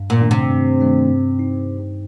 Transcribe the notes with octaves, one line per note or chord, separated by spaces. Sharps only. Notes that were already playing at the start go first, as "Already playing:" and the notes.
Already playing: G2
A#2
D#3 A3 D4
C3
G2
D#3 A3 D4
G2
D#4